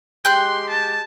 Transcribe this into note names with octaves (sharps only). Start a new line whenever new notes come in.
G#3 G4 G5 C6 F#6
A5